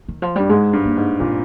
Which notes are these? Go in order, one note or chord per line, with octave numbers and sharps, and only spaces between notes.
D#3
F3
G2 G3
G#2 G#3
G2
A#3
G#2
A#2 C4